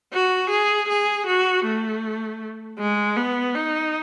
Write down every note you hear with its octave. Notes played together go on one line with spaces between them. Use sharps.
F#4
G#4
G#4
F#4
A3
G#3
B3
D#4